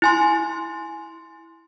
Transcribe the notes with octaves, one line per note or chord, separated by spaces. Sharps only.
E4 G#5 C6